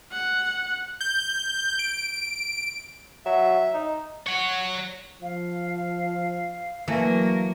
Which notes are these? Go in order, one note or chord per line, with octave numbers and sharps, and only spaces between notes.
F#5
G6
D7
F#3 E5
D#4
C#5 F#5
F3 F5
E3 F#3 A3 A#3